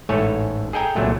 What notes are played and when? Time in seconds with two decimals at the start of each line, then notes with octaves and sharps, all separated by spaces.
0.09 A1 G#2 A3 A4 C#5 G#5
0.73 G#4 A4 D#5 G5 G#5 A#5
0.96 C2 A#2 F#3 A3